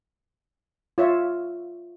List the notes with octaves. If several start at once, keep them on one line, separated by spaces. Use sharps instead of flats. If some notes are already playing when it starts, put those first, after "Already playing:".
F4 C#5 E5